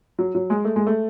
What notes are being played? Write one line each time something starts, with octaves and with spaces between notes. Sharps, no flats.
F#3
F#3
G#3
A3
G#3
A3